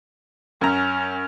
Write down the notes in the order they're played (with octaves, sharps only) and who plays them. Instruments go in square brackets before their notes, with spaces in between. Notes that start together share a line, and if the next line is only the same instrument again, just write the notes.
[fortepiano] F#2 A#5 [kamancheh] C#4 F6